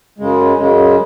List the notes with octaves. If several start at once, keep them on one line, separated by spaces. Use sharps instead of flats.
F#2 C#3 G#3
F#2 C#3 G#3